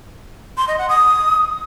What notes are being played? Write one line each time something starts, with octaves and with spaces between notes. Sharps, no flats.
C6
D#5
F#5
D#6